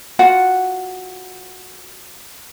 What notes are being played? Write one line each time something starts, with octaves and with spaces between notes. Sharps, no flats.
F4 F#4 F#5